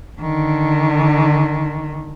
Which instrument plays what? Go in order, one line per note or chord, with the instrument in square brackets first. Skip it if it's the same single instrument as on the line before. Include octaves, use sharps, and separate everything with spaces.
[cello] D3 D#3